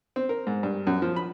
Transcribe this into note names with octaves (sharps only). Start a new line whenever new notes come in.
C4
A#4
G#2
G2
F#2
F3
B5